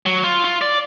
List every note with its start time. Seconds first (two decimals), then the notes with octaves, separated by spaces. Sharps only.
0.06 F#3
0.24 F4
0.44 F4
0.61 D5